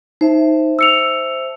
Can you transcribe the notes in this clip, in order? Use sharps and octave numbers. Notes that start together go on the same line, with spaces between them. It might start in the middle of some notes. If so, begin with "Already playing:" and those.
D#4 C5 E5 A5
E6 C#7 F7